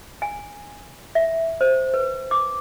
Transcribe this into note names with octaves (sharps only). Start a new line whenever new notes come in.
G#5
E5
C5
B4
D6